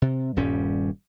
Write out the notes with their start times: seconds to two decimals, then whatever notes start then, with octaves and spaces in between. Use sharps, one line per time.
0.02 C3
0.36 D#1 G2 G3 C#4